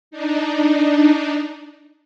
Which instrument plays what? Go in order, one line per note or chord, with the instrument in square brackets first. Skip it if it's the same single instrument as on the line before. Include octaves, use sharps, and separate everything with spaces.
[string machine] D4 D#4